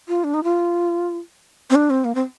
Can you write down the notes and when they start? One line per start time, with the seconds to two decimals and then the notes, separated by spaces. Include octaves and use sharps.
0.08 F4
0.24 D4
0.34 D#4
0.43 F4
1.70 C4
1.75 D4
1.90 C4
2.04 A#3
2.15 C4